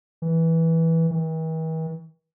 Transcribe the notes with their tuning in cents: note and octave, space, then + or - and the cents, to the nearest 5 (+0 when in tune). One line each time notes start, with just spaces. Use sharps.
E3 -10
E3 -45